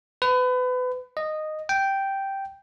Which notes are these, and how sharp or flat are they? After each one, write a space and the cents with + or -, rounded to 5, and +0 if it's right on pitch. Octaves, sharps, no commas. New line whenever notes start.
B4 +30
D#5 -10
G5 -5